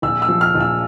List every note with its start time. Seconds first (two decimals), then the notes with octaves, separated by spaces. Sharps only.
0.02 A#1 E6
0.22 E6
0.28 F3
0.41 F6
0.55 A#1
0.60 E6